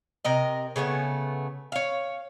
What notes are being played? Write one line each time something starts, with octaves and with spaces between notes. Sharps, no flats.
C3 A#4 D#5
C#3 A3 B3 C#5
C#5 F5